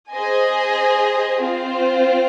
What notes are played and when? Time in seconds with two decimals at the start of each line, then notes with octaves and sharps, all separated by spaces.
0.11 G#4 C5 D#5 G#5
1.40 C4 F4 C5